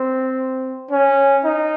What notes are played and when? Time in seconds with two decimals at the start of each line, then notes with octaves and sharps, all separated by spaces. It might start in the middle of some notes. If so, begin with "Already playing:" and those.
Already playing: C4
0.91 C#4
1.44 D#4